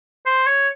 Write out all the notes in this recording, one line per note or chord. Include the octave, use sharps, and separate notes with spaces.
C5
C#5